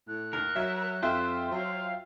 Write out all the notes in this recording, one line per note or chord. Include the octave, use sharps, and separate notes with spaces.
A2 F#6
D#2 A#4
F#3 E5
F2 F4 C5 E5 G5
F#3 F5